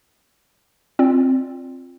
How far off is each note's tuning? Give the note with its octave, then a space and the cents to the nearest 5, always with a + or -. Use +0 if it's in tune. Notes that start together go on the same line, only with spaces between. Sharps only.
C4 +10 F4 +0 D5 +0